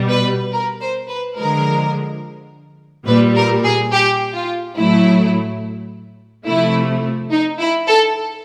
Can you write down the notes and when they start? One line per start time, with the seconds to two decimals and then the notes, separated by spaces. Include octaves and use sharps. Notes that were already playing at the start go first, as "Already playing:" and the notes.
Already playing: B2 G3
0.10 B4
0.53 A#4
0.81 C5
1.09 B4
1.37 D3 F3 G#3 A#4
3.07 A#2 G3 B4
3.36 A#4
3.64 G#4
3.93 G4
4.34 F4
4.77 A2 F#3 A3 E4
6.47 C3 F3 A3 E4
7.31 D#4
7.60 E4
7.88 A4